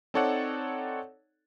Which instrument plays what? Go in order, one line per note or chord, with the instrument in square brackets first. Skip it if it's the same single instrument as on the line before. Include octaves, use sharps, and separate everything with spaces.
[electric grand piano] C4 D#4 A4 C#5 D5 F#5